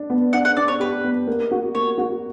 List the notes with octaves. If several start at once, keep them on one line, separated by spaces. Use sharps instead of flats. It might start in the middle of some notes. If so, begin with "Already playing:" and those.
Already playing: D4
B3
D4 F#5
F#5
D4 D5
C#5
G4 B4
B3
A#3
F#4
A#3 C#5
F#4